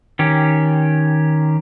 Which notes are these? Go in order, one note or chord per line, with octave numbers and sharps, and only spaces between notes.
D#3 C#4 G4